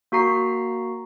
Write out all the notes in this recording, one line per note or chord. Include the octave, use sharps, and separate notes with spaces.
A#3 F#4 A#5 C7